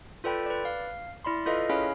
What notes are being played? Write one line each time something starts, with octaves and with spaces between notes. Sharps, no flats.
F4 A4 B4 D5 G5 B5
B4 D5
F5
E4 D5 B5 C6
F4 A4 B4 D#5 F5
C#4 E4 G#4 C#5 F5 B5